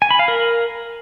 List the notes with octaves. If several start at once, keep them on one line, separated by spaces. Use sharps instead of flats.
G#5
B5
F5
A#4